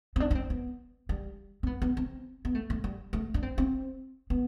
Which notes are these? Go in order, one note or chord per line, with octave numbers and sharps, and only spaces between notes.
C4
D4
D4
C4
B3
G3
C4
B3
B3
C4
B3
A3
A3
G3
A3
D4
C4
C4
B3